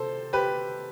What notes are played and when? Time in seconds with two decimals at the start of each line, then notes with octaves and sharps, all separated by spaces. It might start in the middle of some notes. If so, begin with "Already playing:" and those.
Already playing: C3 A4 C5
0.33 G4 B4